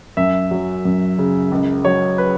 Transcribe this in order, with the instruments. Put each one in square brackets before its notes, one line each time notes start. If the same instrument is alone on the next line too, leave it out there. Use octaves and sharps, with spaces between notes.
[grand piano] F#2 E5
F#3
F#2
C#3
C#2
F#3 C#5
B4